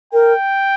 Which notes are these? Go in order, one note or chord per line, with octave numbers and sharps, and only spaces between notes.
A#4 G5